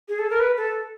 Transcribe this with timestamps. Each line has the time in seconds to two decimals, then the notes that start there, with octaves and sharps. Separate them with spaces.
0.08 G#4
0.19 A4
0.30 A#4
0.39 B4
0.57 A4